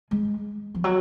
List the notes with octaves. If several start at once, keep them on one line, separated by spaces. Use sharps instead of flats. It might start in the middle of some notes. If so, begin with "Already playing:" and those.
G#3
F3
F#3